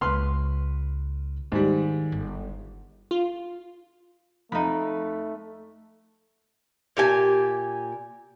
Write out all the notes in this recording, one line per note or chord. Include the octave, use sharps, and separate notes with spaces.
C#2 B4 C6 F6
G#2 D#3 G3
G1
F4
F2 A3 D#4 B5
A#2 G4 G#5